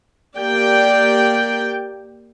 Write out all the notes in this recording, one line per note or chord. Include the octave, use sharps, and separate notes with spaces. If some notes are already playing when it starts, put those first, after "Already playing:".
A#3 G4 D5 G5